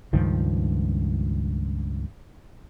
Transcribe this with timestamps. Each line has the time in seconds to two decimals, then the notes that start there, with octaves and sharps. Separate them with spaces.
0.13 C#2 G2 D#3 F3